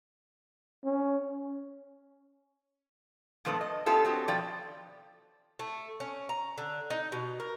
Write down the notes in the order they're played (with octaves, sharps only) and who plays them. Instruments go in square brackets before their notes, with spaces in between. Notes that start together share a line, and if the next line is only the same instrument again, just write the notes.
[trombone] C#4
[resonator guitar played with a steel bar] A#2 F3 A3 B3 F4 A4
D#5
B3 C#4 F4 G4 A4
F#3 C4 G4
B2 F3 D5 G5
[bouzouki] A3
C#4
A#5
D3
D#4
B2
A#4